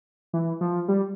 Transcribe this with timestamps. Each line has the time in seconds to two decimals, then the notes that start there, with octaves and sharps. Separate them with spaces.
0.33 E3
0.61 F3
0.88 G3